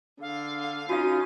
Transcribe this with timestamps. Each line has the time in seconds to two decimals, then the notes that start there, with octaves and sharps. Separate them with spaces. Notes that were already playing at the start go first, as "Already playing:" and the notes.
0.21 D3 F5
0.89 C#4 D#4 F4 F#4 F5 D#7